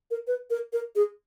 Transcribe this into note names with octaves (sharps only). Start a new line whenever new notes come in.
A#4
B4
A#4
A#4
G#4